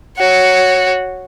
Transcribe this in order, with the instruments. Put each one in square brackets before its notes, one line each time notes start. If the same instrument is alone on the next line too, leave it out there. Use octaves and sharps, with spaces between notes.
[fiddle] F#4 C#5